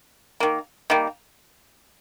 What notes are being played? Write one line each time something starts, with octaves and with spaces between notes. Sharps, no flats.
D#3 A#3
D#3 G3 A#3